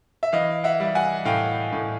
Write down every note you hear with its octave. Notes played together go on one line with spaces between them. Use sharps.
E5
E3 D#5 F5
E5 F#5
G3
F#5 G#5
A2 F5 G5
A2